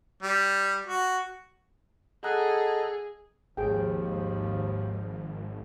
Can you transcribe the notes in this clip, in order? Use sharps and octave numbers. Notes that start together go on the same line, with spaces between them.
G3
F#4
G#4 A4 D#5 F#5 A#5 F#6
G#1 D#2 G#2 F3 G#4 G5